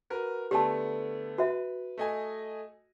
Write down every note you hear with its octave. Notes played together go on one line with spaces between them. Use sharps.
F#4 A#4 B4
D3 A3 B3 G4 A5
F#4 B4 E5
A3 D#5 G#5